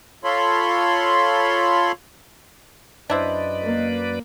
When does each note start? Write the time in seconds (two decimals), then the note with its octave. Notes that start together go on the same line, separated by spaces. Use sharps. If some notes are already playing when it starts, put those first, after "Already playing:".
0.24 F4 A4 C#5 B5 C6
3.10 F#2 D4 E4 B4 C5 D5 D#5
3.63 A#3